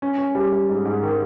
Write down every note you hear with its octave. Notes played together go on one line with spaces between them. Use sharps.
C#4
C#4
G3
G3
G#2
G#2
D#3